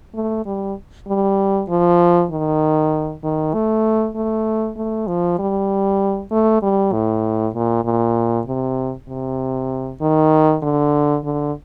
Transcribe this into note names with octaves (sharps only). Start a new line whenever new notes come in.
A3
G3
G3
F3
D#3
D#3
A3
A3
A3
F3
G3
A3
G3
A2
A#2
A#2
C3
C3
D#3
D3
D3